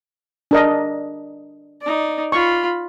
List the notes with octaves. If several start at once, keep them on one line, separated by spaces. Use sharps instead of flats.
D4 A#4 D#5
D#4 D5
F4 B5 C#6